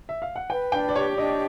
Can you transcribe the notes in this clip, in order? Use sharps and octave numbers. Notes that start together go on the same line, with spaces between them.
E5
F5
F#5
B4 G5
D4 G5
D5
G4 C#5
D4 D#5